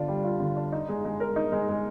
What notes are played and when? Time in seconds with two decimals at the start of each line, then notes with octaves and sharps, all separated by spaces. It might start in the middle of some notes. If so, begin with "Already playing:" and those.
Already playing: D3 D4 F4
0.08 G3
0.24 F4
0.40 D3
0.56 D4
0.72 D#4
0.89 G#3
1.05 G#3
1.20 A#4
1.36 D#4
1.52 G#3
1.69 G#3